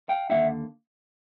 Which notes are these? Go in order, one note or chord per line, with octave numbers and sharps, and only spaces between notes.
F5 G5
D#2 D3 F3 A#3 D#4 E5 F#5